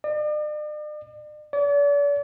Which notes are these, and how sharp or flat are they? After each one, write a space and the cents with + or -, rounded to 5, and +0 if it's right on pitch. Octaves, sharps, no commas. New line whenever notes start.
D5 +45
D5 -40